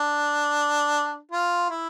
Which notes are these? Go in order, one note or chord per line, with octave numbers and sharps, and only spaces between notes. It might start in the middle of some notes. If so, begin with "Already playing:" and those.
Already playing: D4
F4
E4